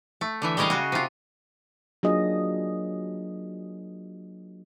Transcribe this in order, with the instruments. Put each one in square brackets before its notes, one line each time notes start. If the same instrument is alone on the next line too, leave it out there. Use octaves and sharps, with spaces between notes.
[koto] A3
D3 E3 E5
G3 G#3 C#4 A#4 D#5 F5
C#3 F#4
C3 F4
[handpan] F#3 A#3 D4 F4 G#4 D#5